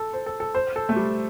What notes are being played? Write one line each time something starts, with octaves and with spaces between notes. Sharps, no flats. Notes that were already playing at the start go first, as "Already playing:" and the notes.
Already playing: A4
C5
A4
A4
C5
A4
A3
G3